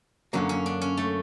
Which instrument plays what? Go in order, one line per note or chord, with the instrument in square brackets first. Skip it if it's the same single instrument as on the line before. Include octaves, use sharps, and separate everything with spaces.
[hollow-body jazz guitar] F#2 D3 F#3 A#3 [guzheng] C#4
[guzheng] C#4
D4
C#4
A3